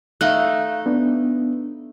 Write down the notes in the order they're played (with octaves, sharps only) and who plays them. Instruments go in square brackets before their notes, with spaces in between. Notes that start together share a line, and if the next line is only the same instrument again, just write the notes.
[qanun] A3 D#4 [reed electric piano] E5 F5 F#6
[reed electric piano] B3 D4